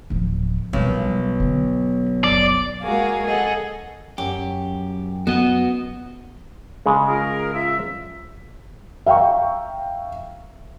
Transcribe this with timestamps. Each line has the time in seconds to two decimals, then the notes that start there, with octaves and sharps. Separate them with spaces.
0.10 D1 F3
0.73 B1 F3 G3
1.40 D3 B3
2.24 F#1 D5
2.82 G#3 A#3 F#4 G#4 F5
3.25 G#4 A4 D#5 F#5
4.18 F#2 G4
5.27 B3 F#4 D#5
6.86 C#3 G#3
7.08 F4 G#4 A#4
7.53 F4 E5
9.06 E5 F5 G5 A#5 C#6